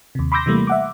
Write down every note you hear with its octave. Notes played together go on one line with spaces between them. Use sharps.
D#2 C3
B5 C6 D6 E6 G6 A#6
C3 E3 G3 A3 A#3
E5 F#5 D6